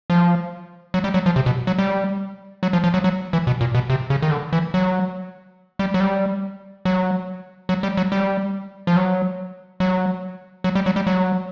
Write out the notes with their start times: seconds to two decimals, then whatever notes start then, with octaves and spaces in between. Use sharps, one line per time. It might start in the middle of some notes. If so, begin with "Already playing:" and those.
0.10 F3
0.94 F#3
1.04 G3
1.14 F#3
1.26 F3
1.36 C3
1.46 B2
1.67 F#3
1.79 G3
2.63 F#3
2.73 F3
2.84 F3
2.94 F#3
3.04 F#3
3.33 E3
3.47 B2
3.61 A#2
3.75 B2
3.90 C3
4.10 C#3
4.22 D#3
4.31 D3
4.53 E3
4.74 F#3
5.79 G3
5.94 F#3
6.00 G3
6.85 F#3
7.69 F#3
7.83 G3
7.97 F#3
8.12 G3
8.87 F3
8.96 F#3
9.80 F#3
10.64 F#3
10.75 G3
10.86 F#3
10.96 G3
11.07 F#3